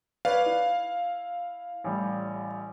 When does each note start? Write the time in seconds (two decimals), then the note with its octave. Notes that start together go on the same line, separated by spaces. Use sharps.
0.25 B4 C#5 D5 F5
0.46 E4
1.84 A1 G3